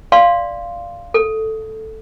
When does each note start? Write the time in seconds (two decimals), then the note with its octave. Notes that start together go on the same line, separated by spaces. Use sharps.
0.12 D5 F5 C6
1.14 A4